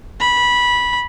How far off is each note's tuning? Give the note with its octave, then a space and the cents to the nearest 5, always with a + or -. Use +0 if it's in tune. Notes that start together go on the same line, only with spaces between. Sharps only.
B5 -15